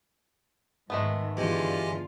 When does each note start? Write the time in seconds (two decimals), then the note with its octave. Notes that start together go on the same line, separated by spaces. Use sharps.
0.90 G#2 D#3 G#3 A3 B3
1.37 E2 G2 D3 F4 G4 D#5 G#5